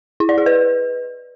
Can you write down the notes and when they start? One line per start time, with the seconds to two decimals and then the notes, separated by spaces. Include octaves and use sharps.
0.20 E4
0.29 D5
0.38 G#4
0.46 B4